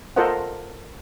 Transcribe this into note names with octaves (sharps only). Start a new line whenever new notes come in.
F4 A4 A#4 C5 D#5 F#5